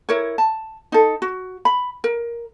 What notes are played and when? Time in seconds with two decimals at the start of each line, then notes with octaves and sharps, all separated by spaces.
0.09 E4 A#4 C#5
0.38 A5
0.92 D#4 A4
1.22 F#4
1.65 B5
2.04 A#4